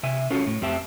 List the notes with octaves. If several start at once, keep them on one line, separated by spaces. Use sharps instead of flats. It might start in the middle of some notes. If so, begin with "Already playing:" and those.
C3 E5 G#5
C#4 F4 F#4 A4
A2
F2 C4 G4 E5 A5